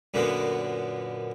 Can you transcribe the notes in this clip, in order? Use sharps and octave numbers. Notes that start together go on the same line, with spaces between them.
F#2 A#2 D3 B3